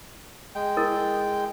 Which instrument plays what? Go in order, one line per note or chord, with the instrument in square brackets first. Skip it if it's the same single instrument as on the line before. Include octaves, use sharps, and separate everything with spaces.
[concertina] G#3 G5
[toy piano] E4 A#4 D#6